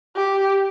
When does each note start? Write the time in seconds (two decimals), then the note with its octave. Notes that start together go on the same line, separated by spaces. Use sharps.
0.16 G4